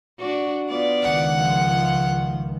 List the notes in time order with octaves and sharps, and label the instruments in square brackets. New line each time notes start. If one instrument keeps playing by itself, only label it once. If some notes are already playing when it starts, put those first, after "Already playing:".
[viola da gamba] D4 F#4
B3 F4 D5
[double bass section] C#2 D#3 [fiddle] F#5
[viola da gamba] F3 F4